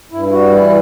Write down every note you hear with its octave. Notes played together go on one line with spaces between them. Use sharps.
G2 E4
E4
G3 F#4
E3 E4